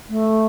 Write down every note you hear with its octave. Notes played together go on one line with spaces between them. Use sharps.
A3